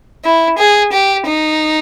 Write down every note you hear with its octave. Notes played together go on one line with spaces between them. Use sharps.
E4
G#4
G4
D#4